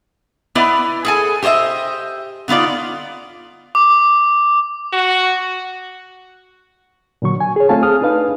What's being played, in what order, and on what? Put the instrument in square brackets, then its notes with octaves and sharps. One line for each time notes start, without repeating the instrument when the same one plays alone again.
[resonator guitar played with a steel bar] B3 E4 B4 D5 D#5
G#4 A4 G#5
G4 C5 C#5 D#5 E5
D3 B3 D#4 F4 D5
[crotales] D6
[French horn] F#4
[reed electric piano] A#2 D3 F#3 C#6
G#5
G#4 C#5
A3 C4 F4 F5 G#5 A5
G#4 D#6 F6
D4 D#4 B4 F5